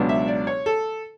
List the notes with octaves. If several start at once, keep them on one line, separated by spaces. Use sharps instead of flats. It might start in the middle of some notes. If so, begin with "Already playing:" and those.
Already playing: C#2 B2 F#3 B3 D4
E5
D5
C#5
A4